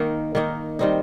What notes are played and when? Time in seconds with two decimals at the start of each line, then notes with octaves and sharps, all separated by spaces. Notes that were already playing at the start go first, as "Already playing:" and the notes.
Already playing: D#3 A#3 D#4
0.35 D#3 A#3 D#4
0.79 D#3 G3 C4 D#4